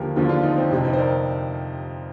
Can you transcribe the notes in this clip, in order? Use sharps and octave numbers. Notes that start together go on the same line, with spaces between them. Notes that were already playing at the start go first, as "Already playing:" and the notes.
Already playing: D#2 D3 F3 G4 A#4
D#2 D3 F3 F4 G#4
D4 F4
C4 D#4
C4
F2 C3 F3 D4
C4 D#4
C5
A#4 D5